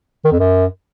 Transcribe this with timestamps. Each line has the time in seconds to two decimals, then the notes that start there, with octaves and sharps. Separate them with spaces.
0.24 D#3
0.32 F2
0.39 F#2